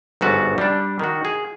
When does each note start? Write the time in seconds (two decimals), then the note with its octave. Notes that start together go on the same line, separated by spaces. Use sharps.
0.21 G1 G#2 F#4 E5 A5
0.58 G3 D4
0.99 D#3 F#4
1.25 G#4